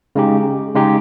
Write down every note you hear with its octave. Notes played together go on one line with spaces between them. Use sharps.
C#3 G#3 D#4 G4
C#3 G#3 D#4 G4